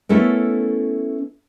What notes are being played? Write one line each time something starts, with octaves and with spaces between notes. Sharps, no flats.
A3 B3 C#4 E4 A4 A#4